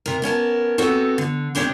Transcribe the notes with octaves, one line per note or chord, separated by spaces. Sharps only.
C3 A#4
B3 C#4 A#4 A5
B3 C4 F#4 A4
D3
C3 D#3 G#3 C#4 D4 G4